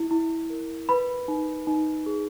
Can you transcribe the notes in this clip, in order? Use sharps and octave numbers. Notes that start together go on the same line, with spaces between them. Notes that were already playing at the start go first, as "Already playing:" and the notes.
Already playing: E4
E4
A#4
B4 B5
D#4
D#4
G#4